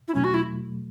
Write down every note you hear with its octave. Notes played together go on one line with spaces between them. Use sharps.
E4
E2 B2 F#3 A3 C#4
F#4
E4